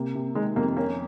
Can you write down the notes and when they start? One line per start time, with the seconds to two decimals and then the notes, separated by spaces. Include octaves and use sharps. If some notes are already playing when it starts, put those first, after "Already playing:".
Already playing: C3 A#3
0.15 C3
0.35 D#3 G#3
0.56 F2 A#3
0.77 A#3 C#4